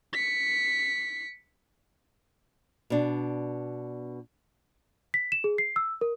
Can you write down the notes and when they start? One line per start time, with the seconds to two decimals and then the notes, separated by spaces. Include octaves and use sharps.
0.13 B6 C#7
2.90 B2 D4
5.14 B6
5.32 E7
5.44 G#4
5.58 C7
5.76 E6
6.01 A#4